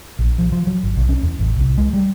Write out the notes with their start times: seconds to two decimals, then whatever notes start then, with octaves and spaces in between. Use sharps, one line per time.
0.19 A#1
0.38 F3
0.52 F3
0.67 F#3
0.83 G#1
0.97 B1
1.09 C#4
1.23 E2
1.39 A1
1.56 C2
1.78 G#3
1.93 G3